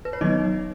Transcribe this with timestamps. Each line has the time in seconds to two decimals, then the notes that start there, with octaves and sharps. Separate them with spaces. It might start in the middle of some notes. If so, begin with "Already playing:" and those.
0.05 B4
0.13 C#5
0.21 D#3 F#3 B3 D#4 D#5